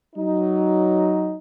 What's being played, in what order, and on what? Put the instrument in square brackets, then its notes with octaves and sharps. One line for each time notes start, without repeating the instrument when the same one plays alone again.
[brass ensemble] F#3 D#4